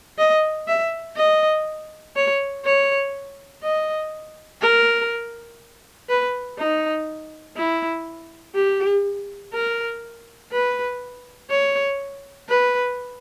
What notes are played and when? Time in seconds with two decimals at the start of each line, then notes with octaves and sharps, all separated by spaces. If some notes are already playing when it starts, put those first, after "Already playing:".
0.18 D#5
0.68 E5
1.17 D#5
2.16 C#5
2.65 C#5
3.64 D#5
4.62 A#4
6.09 B4
6.59 D#4
7.57 E4
8.55 G4
9.54 A#4
10.52 B4
11.50 C#5
12.49 B4